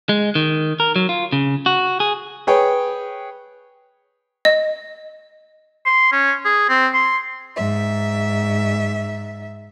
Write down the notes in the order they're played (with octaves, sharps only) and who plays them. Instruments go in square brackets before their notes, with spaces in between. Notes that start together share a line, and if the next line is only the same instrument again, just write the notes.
[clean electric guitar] G#3
D#3
A#4
F#3
F4
C#3
F#4
G#4
[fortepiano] G#4 B4 C#5 G5
[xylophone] D#5
[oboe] C6
C#4
G#4
C4
C6
[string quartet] G#2 E5